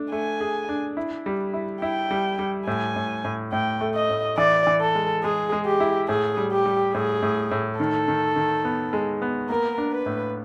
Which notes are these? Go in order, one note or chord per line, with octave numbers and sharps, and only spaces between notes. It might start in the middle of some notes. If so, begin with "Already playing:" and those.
Already playing: A3 D4
A3 G#5
G#4
D4
E4
G3
E4
E4 G5
G3
G3
A2 G#5
A2
A2
A2 G5
A3
D#5
A2
E3 D5
E3
A4
G#3
G#3 G#4
G#3
G4
E4
A2 G#4
G3
G4
G3
A2 G#4
A2
A2
D#3 A4
D#3
D#3
B3
G#3
B3
A#3 A#4
D4
B4
A2